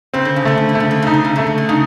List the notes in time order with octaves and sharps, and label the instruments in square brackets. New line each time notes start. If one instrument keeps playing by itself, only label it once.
[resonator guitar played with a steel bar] C#3 [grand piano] C4
[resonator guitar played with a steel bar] D3
C#3
[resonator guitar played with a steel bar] D3 [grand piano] A3
[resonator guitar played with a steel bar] C#3
D3
[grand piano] A3
[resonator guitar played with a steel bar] C#3
D3
[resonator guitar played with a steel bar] C#3 [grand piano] D#4
[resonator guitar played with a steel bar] D3
C#3
[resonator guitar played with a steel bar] D3 [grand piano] A3
[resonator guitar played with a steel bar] C#3
D3
[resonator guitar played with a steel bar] C#3 [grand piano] D#4